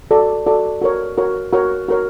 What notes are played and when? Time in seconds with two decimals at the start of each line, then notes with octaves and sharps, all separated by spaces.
0.11 F#4 A4 D5
0.47 F#4 A4 D5
0.81 F#4 A#4 C#5
1.18 F#4 A#4 C#5
1.53 F#4 A#4 C#5
1.88 F#4 A#4 C#5